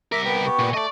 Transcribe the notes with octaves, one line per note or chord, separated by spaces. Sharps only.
C2 A#4 E5 D6 B6
B3 G4
C#6
A#2
A3 D5 D#5